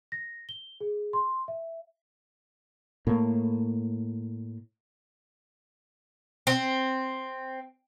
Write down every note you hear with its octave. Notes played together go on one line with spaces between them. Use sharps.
A#6
G7
G#4
C6
E5
A2 A#3
C4